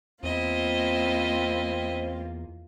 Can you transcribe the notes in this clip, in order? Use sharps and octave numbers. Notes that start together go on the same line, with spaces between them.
E2 A#3 C4 E4 F4 D#5